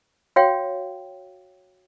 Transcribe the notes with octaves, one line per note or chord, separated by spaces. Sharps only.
F#4 C#5 F5 G5